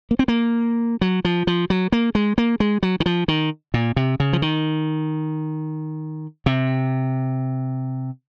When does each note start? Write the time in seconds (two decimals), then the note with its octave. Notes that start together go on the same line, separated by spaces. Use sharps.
0.11 A#3
0.19 C4
0.28 A#3
1.01 F#3
1.25 F3
1.47 F3
1.70 F#3
1.92 A#3
2.15 G#3
2.38 A#3
2.60 G#3
2.83 F#3
3.00 D#3
3.06 F3
3.28 D#3
3.74 A#2
3.96 C3
4.20 C#3
4.33 F3
4.42 D#3
6.46 C3